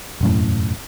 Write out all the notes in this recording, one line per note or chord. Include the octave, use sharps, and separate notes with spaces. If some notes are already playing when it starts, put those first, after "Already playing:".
E1 F#2 A2